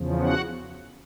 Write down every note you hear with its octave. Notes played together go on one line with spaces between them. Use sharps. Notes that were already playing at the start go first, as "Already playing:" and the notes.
Already playing: E2 C#3 F3
F#4 F#5